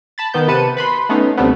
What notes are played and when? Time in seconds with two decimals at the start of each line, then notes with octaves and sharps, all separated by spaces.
0.18 A5 B5 A6
0.34 D#3 B3 G6
0.48 C3 B4 A5 C#7 D#7
0.77 B4 B5 C6
1.09 A3 B3 C#4 D#4
1.37 D2 C3 G3 A3 B3